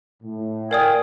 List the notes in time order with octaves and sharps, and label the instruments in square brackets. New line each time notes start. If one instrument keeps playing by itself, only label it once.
[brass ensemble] A2
[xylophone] A#4 D5 D#6 [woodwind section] F5 G5 G#5